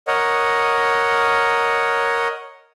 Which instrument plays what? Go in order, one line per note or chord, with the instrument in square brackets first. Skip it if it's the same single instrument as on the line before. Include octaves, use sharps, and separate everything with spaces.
[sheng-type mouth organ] A#4 C#5 D#5 F#5